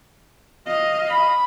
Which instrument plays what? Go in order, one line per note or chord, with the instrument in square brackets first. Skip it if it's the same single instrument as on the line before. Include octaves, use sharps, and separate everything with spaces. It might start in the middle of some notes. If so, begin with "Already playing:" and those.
[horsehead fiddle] D#5 F5
[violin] B5